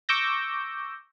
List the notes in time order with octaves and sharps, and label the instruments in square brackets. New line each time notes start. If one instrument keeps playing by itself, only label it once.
[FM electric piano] C#6 D6 E6 G6 A#6